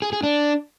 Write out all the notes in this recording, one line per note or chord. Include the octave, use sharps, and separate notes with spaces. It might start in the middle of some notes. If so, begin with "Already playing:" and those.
G#4
G#4
D4